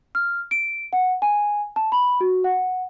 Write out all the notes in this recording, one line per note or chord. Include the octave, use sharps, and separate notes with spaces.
F6
D7
F#5
G#5
A5
B5
F#4
F#5